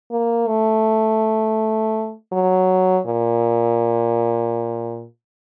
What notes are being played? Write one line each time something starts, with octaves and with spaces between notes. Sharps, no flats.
A#3
A3
F#3
A#2